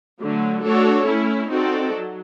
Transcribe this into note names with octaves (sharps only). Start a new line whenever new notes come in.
D3 F#3 A3
A3 D4 F#4 A4 C#5
A3 C#4 E4
C4 D#4 F#4 A4 D5
F#3